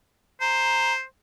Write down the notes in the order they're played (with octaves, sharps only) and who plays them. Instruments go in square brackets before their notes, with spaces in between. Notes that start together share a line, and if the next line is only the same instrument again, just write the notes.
[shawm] C5 [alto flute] A#5